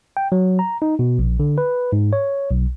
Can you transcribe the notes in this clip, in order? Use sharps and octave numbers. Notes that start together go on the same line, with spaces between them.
G5
F#3
A#5
D#4
B2
A#1
D3
B4
G#2
C#5
B1